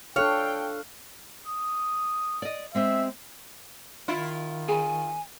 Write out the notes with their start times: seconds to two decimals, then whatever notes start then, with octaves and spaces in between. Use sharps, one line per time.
0.16 D4 A4 C#5 F5 G5 F6 F#6
1.47 D#6
2.42 D5 D#5
2.75 G#3 C4 G4 E5
4.08 D#3 E4 F4
4.68 G#4 G#5 B5